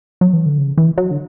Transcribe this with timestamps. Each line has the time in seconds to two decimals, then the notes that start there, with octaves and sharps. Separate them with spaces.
0.21 F#3
0.33 E3
0.46 D3
0.58 C#3
0.78 E3
0.98 F#3
1.11 D3